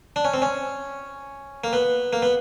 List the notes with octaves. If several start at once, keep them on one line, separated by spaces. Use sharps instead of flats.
D4
C#4
C4
C#4
A#3
B3
A#3
B3